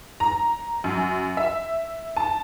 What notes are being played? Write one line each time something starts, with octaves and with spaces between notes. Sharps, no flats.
A#5
F#2
E5
A5